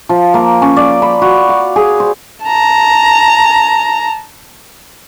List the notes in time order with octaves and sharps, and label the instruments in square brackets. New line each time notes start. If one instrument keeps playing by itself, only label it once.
[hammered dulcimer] F3
A#3
C#4
D5
B5
F#4
F5
G#4
C5
[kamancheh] A5 A#5